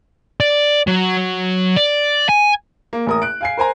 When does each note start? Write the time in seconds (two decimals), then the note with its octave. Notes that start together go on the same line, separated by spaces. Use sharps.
0.40 D5
0.87 F#3
1.76 D5
2.29 G#5
2.93 A#3
3.07 A1 A#4 D#6
3.22 F#6 D7
3.41 F5 G#5 C7
3.57 A#4 C5 G#5 A#5